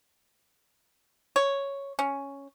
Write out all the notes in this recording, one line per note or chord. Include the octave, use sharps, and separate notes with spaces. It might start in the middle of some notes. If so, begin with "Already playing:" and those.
C#5
C#4